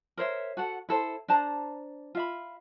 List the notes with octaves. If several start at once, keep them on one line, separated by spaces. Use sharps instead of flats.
A#4 C5 C#5 E5
F#4 A4 F#5
E4 A4 C5
D4 C5 A5 A#5
F4 E5 B5